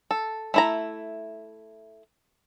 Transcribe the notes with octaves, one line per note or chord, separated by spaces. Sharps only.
A4
A3 E4 A#5